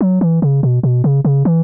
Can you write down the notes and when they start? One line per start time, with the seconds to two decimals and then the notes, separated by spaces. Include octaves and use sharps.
0.01 F#3
0.21 E3
0.42 C#3
0.63 B2
0.83 B2
1.04 C#3
1.25 C#3
1.45 E3